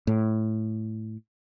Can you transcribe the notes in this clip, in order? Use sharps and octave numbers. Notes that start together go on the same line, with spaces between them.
A2